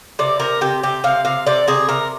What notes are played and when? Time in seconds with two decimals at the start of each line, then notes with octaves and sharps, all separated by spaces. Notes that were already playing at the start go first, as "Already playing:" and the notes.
0.19 C3 D5
0.40 C3 A#4
0.61 C3 G4
0.83 C3 G4
1.04 C3 F5
1.25 C3 F5
1.47 C3 D5
1.68 C3 G#4
1.89 C3 A#4